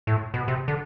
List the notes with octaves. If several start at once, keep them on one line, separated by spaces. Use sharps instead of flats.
A2
B2
C3
D3